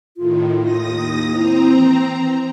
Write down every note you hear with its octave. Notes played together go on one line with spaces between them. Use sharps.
A2 D#3 F4
D#2 D#6 A#6
C4 E4 A#5
E3
E3